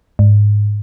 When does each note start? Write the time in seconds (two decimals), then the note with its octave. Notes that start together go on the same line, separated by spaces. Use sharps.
0.19 G#2